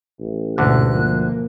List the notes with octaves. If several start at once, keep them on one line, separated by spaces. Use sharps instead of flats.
A1
D2 G#2 B2 D3 F#6
F3 A#3